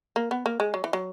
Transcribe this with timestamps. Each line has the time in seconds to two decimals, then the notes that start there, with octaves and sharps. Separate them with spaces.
0.16 A#3
0.31 B3
0.46 A#3
0.60 G#3
0.74 F#3
0.84 E3
0.93 F#3